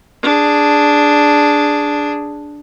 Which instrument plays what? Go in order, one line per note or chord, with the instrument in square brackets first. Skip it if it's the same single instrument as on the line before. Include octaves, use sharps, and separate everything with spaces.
[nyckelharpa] D4 G#4